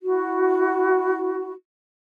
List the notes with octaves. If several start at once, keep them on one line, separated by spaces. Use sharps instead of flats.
E4 F#4